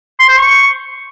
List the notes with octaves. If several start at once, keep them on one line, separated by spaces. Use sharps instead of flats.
C6
C5
C#6